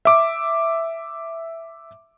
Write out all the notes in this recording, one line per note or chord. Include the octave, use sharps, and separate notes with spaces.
E5 D6